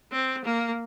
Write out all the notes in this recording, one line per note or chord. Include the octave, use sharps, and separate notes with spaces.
C4
A#3